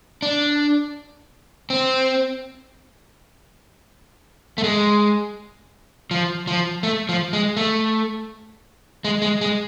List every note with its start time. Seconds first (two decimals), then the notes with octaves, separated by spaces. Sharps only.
0.22 D4
1.70 C4
4.58 A3
4.64 G#3
6.11 F3
6.47 F3
6.83 A3
7.09 F3
7.33 G#3
7.57 A3
9.05 G#3
9.22 G#3
9.41 G#3